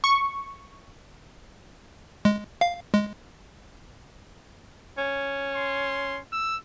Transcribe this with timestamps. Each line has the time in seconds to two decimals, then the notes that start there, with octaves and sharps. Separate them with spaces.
0.04 C#6
2.25 G#3
2.61 F5
2.94 G#3
4.98 C#4
5.55 C6
6.32 E6